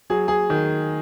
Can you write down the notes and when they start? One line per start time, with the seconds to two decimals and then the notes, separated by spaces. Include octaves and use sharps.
0.10 F#3 G#4
0.28 G#4
0.50 D#3